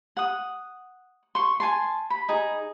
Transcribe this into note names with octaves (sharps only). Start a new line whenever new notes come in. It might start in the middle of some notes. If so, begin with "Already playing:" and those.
F#5 D#6
C6 C#6
G#5 A5 C6
B5
D#4 G#4